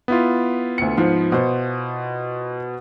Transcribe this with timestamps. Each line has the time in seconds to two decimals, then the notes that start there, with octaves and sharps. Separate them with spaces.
0.08 B3 E4 F4
0.78 D2 C#7
0.97 G#2 F3
1.32 B2 C5